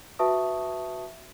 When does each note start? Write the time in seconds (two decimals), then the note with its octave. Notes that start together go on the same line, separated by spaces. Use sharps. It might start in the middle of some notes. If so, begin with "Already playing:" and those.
0.19 F#4 B4 E5 A5 C#6 D#6